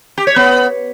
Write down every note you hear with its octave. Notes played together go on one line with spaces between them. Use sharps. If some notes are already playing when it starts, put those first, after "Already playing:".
G4
C#5
B3